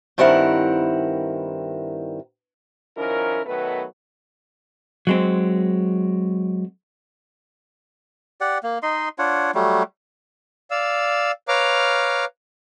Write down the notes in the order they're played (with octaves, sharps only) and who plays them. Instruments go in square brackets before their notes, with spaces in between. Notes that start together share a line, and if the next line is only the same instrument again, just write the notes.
[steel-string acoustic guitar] G2 D#3 C4 E4 A#4 F#5
[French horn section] D#3 F3 C#4 E4 A#4
B2 D#3 F#3 A3 B3 B4
[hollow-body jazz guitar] F#3 G#3 C4
[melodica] G4 D5 F#5
A#3
D#4 D#5 C6
D4 F4 C#5 F#5
F#3 G3 A3
[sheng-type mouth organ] D5 F5 E6
B4 C#5 F5 A#5 D6 F6